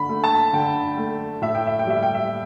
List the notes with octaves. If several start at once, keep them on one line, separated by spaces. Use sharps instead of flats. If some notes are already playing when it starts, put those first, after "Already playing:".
Already playing: D3 B5
A3
A5
D3 G5
A3
A2 E5
G5
E5
G5
G3 E5
G5
E5